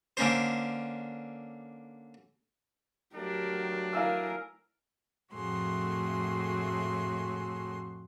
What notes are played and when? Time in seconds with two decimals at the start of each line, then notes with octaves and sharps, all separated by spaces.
0.17 D3 A#3 C#4 C5
3.15 F#3 A3 D4 G4 A#4
3.93 E4 A#4 F5 G#5 E6
5.33 F2 A2 A3 F#4 G#4 C6